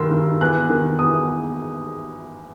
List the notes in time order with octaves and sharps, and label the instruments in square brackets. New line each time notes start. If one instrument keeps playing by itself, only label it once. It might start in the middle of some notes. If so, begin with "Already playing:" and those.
Already playing: [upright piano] G2 D#3 C6 E6
D#3
E2 F#6
D#3
E2 D#6